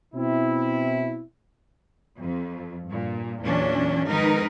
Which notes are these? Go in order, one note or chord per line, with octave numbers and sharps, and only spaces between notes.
B2 C4 E4
F2
G2 A#2
E2 A#2 E3 F#3 C#4 D4
F2 G#2 D#3 D#4 A#4 B4